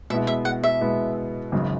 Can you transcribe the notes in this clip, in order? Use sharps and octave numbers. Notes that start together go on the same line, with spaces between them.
B2 G#3 B3 E4 E5
E5
F#5
E5
B2 G#3 B3 E4
G#1 F#2 C#3